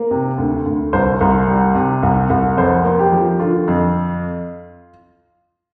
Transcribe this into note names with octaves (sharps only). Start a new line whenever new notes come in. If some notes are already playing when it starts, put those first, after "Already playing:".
Already playing: A#3
C3
D2
D2
C2 C5
C2
G3
C3
C2
C2
F2 C5
A#3
G4
F3
D3 F4
F2